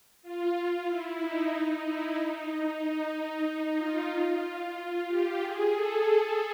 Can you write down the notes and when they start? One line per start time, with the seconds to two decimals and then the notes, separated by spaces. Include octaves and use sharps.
0.23 F4
0.55 F4
0.87 E4
1.19 D#4
1.84 E4
2.16 D#4
2.81 D#4
3.46 D#4
3.78 F4
4.10 F4
5.07 G4
5.40 G#4
5.72 A4